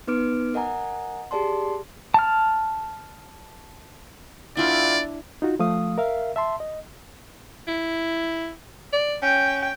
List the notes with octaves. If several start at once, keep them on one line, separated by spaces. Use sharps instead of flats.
B3 D#4 B4 D6 F6 D7
A#4 D#5 F#5 G#5 A#5
G4 G#4 D5 A5 C6
A5 F6
E2 D3 D4 E4 F4 D5
D#4 F4 F#4
F3 A3 F5 D#6
A#4 E5 F5
E5 A5 C6
D#5
E4
D5
C#4 G5